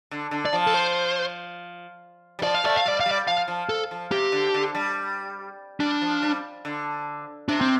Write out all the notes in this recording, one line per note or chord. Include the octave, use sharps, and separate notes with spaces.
D3
D3
D5
F3
A4
C5
G3
F3 D5
F5
A3 D5
F5
G3 D5
F5
G3
D5
F3 F5
F3
A4
F3
C3 G4
D3
D3
G3
G3 D4
F3
G3
D3
C3 D4
C4